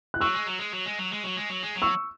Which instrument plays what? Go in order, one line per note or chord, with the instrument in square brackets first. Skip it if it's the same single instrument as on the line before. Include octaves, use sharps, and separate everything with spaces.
[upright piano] F#6
[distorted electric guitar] F#3 [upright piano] C#6 E6
[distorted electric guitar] G#3
F#3
G#3
F#3
G#3
F#3
G#3
F#3
G#3
F#3
G#3
F#3
[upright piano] C#6 E6